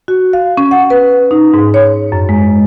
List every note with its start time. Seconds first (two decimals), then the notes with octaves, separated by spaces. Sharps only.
0.08 F#4
0.33 F5
0.57 C#4
0.71 F#5
0.90 B4
1.31 D#4
1.54 G#2
1.74 C#5
2.12 F#2
2.29 G#3